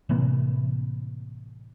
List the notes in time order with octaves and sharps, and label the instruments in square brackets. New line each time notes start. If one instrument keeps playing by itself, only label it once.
[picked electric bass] A2 C3 E3 A#3